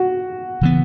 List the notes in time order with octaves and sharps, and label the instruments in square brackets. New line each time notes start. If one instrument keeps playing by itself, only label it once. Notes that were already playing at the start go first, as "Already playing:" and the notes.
Already playing: [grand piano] F#4
[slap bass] C#3 E3 B3